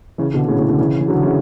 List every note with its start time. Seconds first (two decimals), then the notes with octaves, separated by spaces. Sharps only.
0.18 C#3 E3
0.34 B2 D3
0.48 A2 C#3
0.59 A2 C#3
0.68 B2 D3
0.79 C#3 E3
1.00 E3
1.08 D3 F#3
1.23 C#3 E3